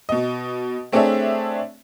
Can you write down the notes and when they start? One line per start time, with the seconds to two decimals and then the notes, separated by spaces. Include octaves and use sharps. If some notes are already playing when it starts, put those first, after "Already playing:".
0.09 B2 D#5
0.92 A3 C4 D4 G#4 C#5 E5